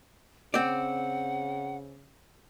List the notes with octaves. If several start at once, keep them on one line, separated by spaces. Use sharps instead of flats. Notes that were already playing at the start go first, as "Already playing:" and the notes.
C#3 C4 D5 F#5